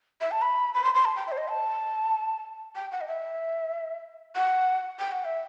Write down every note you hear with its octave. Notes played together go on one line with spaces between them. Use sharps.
E5
A5
B5
B5
C6
C6
A5
G5
E5
C5
D#5
A5
G5
F#5
D#5
E5
F#5
G5
F#5
E5